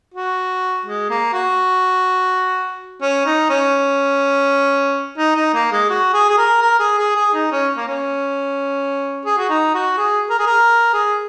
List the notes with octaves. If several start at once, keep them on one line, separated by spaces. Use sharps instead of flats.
F#4
G#3
A#3
F#4
C#4
D#4
C#4
D#4
D#4
A#3
G#3
F#4
G#4
G#4
A#4
A#4
G#4
G#4
G#4
D#4
C#4
A#3
C#4
G#4
F#4
D#4
F#4
G#4
A#4
G#4
A#4
G#4